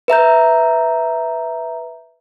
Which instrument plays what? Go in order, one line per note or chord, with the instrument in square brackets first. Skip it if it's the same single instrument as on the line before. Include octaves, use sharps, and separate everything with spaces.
[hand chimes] B4 E5 A#5 G6